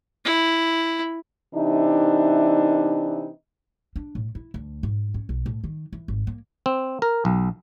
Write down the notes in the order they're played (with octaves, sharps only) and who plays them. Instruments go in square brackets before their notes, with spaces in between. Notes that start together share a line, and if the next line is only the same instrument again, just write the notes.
[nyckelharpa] E4
[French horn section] C3 E3 D4 D#4
[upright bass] D4
A2
E4
D2
G#2
C#4
B1
A2
D#3
E3
G#1
A#3
[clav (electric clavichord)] C4
A#4
B1